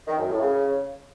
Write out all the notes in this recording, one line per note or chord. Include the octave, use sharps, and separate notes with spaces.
D#3
F#2
A2
C#3